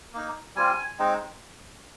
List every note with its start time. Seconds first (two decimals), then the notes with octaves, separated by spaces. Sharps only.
0.14 A#3 D#4
0.56 G3 C4 F4 G#5
0.99 G#3 C4 D#4